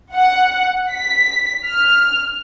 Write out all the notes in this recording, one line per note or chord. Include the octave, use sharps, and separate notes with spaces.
F#5
B6
F6